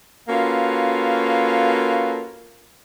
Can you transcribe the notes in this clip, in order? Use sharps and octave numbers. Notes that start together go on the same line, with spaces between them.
A#3 C#4 F4 F#4 A4 B4